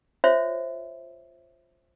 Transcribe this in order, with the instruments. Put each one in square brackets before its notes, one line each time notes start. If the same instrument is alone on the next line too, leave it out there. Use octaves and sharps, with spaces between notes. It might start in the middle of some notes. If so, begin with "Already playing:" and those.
[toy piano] F4 C5 C#5 E5